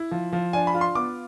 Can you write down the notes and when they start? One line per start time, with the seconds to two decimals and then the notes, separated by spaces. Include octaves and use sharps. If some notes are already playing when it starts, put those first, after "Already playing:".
Already playing: E4
0.11 F3
0.33 F3
0.53 D4 G#5
0.67 B5
0.74 F4
0.81 C6
0.95 B3 D6